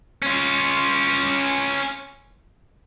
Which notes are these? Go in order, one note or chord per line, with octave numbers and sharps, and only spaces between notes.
C#4 F4